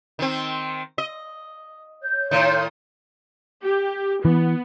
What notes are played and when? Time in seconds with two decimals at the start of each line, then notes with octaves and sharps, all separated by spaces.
0.19 D#3 C4
0.98 D#5
2.02 C#5 G6
2.31 A2 D#3
3.64 G4
4.25 E3 B3